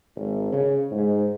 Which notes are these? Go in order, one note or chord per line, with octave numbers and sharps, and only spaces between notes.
G#1
C#3
G#2